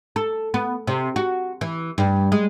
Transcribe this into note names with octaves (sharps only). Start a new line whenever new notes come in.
A4
B3
C3
F#4
E3
G2
G#3